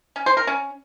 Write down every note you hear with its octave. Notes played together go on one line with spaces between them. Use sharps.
C#4
C5
A#4
C#4